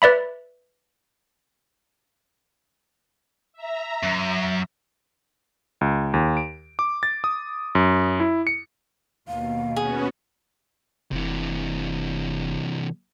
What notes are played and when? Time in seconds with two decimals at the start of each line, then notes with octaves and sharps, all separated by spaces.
0.02 B4 D5 E5 B5
3.53 E5 A#5
4.03 F#2
5.81 C#2
6.14 D#2
6.37 D7
6.79 D6
7.03 A6
7.24 D#6
7.75 F#2
8.20 E4
8.47 C#7
9.28 D#2 B2 F5
9.76 B3 C#4 F#4 G#4
11.12 F1 C3 E3